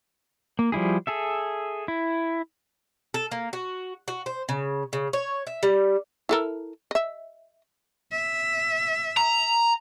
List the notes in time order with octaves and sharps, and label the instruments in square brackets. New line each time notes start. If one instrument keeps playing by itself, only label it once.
[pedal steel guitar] A#3
F3 G3 E4 G#4
G#4 A4 E5
E4
[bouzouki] A4
A#3
F#4
F#4
C5
C#3
C#3
C#5
E5
G3
[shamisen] E4 A4 A#4
D#5 E5
[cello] E5
[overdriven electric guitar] A#5